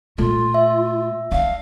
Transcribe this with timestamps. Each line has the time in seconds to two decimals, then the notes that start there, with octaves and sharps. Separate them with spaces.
0.18 A#2 A3 F4
0.54 E5
1.32 D4 F5